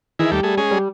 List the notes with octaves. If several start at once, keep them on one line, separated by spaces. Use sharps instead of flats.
D#3 E3 E4 G#4
D#2 G3 A3 G4
A3 G#4
G#3 C#4 G#4
G3